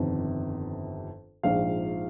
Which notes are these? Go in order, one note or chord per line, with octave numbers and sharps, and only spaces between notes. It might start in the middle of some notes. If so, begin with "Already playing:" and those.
Already playing: G1 F2 C3 D#3
A#1 G#2 F3 F5